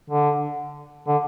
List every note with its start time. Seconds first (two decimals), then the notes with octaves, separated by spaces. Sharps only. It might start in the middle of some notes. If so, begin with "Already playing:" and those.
0.10 D3
1.07 D3